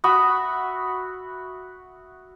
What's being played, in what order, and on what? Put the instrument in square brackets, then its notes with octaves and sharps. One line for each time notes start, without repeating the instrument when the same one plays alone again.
[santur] F#4 E5 B5 D#6